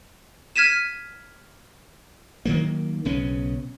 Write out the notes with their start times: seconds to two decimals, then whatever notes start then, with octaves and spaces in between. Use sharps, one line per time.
0.56 F6 G#6 B6 D#7 E7
2.45 D#3 F#3 A#3
3.05 B1 C#3 B3 C#4